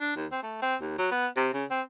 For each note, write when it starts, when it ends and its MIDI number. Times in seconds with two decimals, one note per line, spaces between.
0.01 0.16 62
0.16 0.26 39
0.32 0.40 60
0.43 0.61 57
0.62 0.76 60
0.81 0.94 39
0.98 1.09 54
1.11 1.27 59
1.37 1.51 48
1.54 1.65 49
1.70 1.82 60